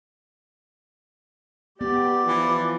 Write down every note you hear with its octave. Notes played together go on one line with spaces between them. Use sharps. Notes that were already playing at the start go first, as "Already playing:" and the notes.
B3 G4 D5
E3 F3